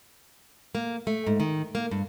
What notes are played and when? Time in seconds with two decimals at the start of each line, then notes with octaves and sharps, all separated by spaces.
0.75 A#3
1.07 A3
1.27 G#2
1.40 D#3
1.75 A#3
1.91 G2